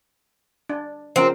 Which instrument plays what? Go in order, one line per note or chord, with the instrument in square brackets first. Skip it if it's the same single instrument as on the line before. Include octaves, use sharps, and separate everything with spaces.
[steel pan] D4
[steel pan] C#3 F3 A#4 [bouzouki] C4